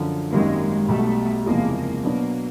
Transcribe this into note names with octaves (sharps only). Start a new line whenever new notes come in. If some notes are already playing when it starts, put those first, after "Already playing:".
Already playing: F#2 D3 F3
G#1 F#2 D#3 G3 G#3 A#3
B1 B2 G3 A3
F#1 E2 C3 F3 G#3 A#3
B2 F#3 A#3 B3 D4